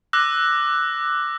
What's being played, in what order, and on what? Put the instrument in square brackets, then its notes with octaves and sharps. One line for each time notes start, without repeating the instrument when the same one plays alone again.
[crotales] D6 E6 F#6 A#6